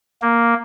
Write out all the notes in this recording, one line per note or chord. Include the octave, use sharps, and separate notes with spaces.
A#3